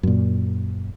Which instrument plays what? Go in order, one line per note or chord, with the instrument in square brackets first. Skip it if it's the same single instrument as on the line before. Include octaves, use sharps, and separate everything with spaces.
[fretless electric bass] F#2 A#2